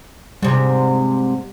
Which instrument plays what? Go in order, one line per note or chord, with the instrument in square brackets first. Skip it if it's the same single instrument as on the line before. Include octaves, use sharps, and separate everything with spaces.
[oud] G#2 C3 [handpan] G3